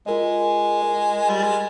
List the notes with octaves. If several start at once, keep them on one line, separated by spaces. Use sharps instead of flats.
G#3 F4 A#4 D#5
F4 A#4 D#5
G3
G#3